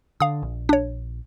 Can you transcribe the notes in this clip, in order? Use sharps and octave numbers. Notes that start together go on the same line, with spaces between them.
D3 F5 D#6
A#1
D4 C#5